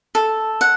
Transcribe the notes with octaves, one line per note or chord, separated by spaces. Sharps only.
A4
F#5